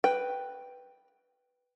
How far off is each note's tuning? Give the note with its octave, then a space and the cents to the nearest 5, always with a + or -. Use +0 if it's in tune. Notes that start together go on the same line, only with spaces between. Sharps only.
B4 +0 G5 +0